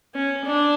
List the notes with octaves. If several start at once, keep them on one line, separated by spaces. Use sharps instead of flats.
C#4
D4